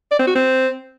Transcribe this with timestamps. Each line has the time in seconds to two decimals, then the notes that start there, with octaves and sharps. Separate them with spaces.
0.11 D5
0.19 C4
0.27 F#4
0.35 C4